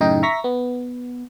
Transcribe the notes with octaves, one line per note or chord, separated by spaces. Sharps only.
F#2 A2 C#3 D#4 D#5 G5
E5 A#5 C#6 A#6 B6
B3